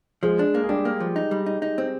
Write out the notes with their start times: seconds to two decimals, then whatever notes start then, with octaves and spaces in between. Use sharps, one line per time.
0.23 F3 G#3 G#4
0.39 D4
0.55 A#3
0.64 G#4
0.69 G3 D4 G4
0.85 A#3
1.00 F3
1.16 D#4
1.31 G3
1.46 D#4
1.62 D#4
1.78 C4